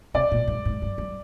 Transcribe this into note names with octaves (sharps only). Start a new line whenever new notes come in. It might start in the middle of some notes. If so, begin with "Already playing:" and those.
C3 D5
A#2
G#2
G#2
G2
G2